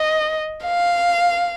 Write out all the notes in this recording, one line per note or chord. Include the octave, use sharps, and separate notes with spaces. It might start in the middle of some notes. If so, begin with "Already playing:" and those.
Already playing: D#5
F5